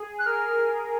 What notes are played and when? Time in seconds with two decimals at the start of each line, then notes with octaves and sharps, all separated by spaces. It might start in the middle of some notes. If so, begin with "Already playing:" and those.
Already playing: G#4
0.19 F#6
0.26 A#4 F6